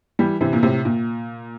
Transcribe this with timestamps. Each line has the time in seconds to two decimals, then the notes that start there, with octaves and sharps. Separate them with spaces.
0.19 E3 G3
0.41 C3 E3
0.53 A#2
0.63 A2 C3
0.85 A#2